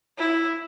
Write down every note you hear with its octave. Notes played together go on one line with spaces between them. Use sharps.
E4